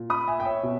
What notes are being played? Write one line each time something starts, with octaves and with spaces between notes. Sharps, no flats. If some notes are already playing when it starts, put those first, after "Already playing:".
Already playing: A#2
B5 D#6
E5 G#5
G5
C#5 E5
B2